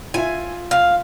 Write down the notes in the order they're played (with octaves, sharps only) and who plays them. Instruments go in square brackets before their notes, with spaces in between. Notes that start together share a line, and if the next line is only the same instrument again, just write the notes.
[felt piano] F4 E5 [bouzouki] G#5
[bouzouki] F5